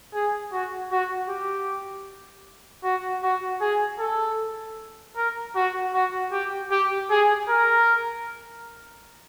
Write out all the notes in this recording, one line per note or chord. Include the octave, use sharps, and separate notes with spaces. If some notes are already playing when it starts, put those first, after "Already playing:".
G#4
F#4
F#4
G4
F#4
F#4
G#4
A4
A#4
F#4
F#4
G4
G4
G#4
A#4